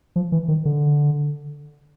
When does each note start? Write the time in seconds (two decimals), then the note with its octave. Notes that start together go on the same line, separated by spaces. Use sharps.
0.16 F3
0.32 E3
0.48 D#3
0.65 D3